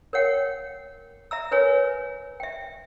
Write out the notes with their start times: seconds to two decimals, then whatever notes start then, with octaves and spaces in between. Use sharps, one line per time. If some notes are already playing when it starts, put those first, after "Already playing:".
0.13 A#4 C#5 F#5 G5
1.31 E5 A#5 E6
1.51 A#4 B4 C#5 G#5
2.40 E5 G5